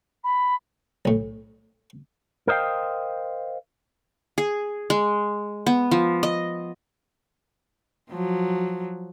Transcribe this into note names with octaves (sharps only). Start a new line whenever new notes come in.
B5
B1 A2
A#4 C5 D#5 F5 G5
G#4
G#3
B3
F3
D#5
F3 F#3